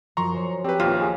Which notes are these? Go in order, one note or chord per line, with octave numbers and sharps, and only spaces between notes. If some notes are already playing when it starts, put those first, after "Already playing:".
F#2 F3 A#5 C6 C#6
C5 C#5
C4 G4 B4
A#1 D#2 F4
G#4